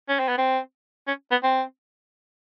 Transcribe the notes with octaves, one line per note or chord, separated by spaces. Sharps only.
C#4
C4
B3
C4
C#4
B3
C4